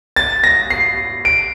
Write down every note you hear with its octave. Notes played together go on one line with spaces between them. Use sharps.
A6
A#6
C7
D7